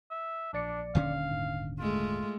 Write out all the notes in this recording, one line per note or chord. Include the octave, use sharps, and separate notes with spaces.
E5
A#1 D4 D5 C#7
D#1 D3 C#4 F5
G#2
G#3 A3 F4